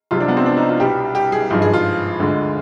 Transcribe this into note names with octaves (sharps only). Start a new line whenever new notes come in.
C2 C3 F3 G#3 F4
D4
B3
C4
D4
D#4
F4
C2 B2 G3 G4
G4
G#4
G#1 G2 F3 G#3
G#4
F4
D2 D3 G#3